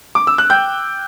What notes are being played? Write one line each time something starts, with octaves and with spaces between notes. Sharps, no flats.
D6
E6
F#6
G5 G6